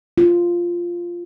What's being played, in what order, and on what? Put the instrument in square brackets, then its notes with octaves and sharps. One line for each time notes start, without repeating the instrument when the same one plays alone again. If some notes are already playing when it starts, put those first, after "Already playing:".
[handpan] F4